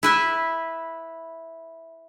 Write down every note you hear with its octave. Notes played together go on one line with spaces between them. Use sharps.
E4 B4 E5